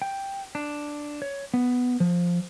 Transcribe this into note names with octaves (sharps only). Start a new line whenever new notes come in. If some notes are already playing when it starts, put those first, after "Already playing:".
G5
D4
C#5
B3
F3